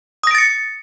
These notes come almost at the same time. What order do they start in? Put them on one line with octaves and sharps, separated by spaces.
D#6 A#6 D7 A6 C#7